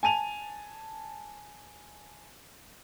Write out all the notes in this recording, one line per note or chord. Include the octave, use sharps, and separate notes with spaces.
G#5 A5 D#7 F7